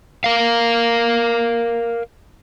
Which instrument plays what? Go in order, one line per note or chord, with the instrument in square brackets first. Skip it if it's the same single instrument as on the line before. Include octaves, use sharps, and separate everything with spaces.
[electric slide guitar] A#4 F5